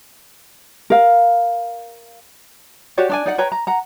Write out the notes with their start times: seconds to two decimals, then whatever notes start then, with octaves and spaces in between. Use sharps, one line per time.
0.90 A#4 F5
2.97 F#4 G4 C#5 D5
3.09 D4 D5 G#5
3.26 D#4 D5 F#5
3.38 B4 C#5 G5 A#5
3.52 A#5
3.67 F#5 A#5